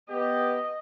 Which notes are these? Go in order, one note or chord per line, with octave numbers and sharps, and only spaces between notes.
B3 G4 D#5